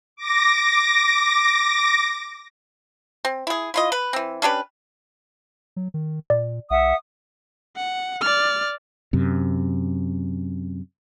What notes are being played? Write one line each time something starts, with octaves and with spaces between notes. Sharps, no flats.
D6 A#6
C4
E4 G#4
E4 F4 D#5
B4
E3 C4
C#4 D4 G4 B4
F#3
D#3
A#2 D5
B1 E5 F#5 D#6
F#5
D5 F6
F#2 C3